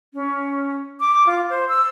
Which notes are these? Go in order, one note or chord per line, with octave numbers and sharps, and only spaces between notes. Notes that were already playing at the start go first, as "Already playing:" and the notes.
C#4
D6
F4
C5
E6